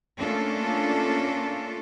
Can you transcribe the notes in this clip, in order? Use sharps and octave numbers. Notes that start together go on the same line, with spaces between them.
A3 A#3 C#4 D4 F4 A4